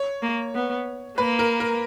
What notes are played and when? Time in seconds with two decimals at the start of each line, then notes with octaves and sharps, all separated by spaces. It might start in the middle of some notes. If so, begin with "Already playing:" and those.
Already playing: C#5
0.23 A#3
0.55 B3
1.18 A#3 B4
1.39 A#4
1.60 A#4